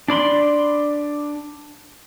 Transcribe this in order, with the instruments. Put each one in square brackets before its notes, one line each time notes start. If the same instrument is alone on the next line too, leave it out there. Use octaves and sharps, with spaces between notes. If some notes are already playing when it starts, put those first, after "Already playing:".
[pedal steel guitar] D4 D5 B5 C6